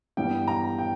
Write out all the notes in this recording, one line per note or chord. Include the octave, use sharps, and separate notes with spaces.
G2 E3 G3 B3 G5
A#5
G5